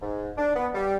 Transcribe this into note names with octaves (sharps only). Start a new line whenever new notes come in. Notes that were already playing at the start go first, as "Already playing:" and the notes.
G#2
D4
B3
G3